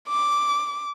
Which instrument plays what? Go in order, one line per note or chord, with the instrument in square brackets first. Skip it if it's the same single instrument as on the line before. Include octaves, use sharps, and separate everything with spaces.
[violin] D6